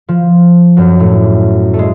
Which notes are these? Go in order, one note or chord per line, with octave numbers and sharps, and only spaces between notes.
F3
F#2 F#3
A2 A3
A3
G#3